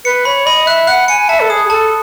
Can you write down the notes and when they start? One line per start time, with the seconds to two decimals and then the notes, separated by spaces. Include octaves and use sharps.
0.05 B4 C#7
0.25 C#5 B5
0.46 D#5 B5
0.67 E5 F#6
0.87 F#5 F#6
1.08 G#5 C#7
1.29 E5 A5
1.40 A4
1.50 G#4 D#6
1.65 G#4
1.70 A4 A5